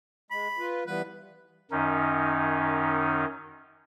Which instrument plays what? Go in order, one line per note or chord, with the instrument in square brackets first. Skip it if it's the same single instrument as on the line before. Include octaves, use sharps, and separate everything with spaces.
[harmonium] G#3 [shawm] B5
[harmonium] F4 B4
[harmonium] E3 G3 B3 [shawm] B4
[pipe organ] F#2 D#3 C#4 D#4